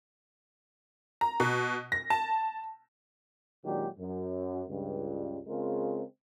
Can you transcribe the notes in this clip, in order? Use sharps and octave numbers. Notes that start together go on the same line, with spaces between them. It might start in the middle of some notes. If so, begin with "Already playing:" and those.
A#5
B2
A#6
A5
A#2 D#3 F#3 G#3 D4 G4
F#2
C#2 G2
C#3 G#3 C4 F4 A#4